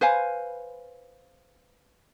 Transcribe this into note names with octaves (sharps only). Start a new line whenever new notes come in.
B4 C5 F5 G#5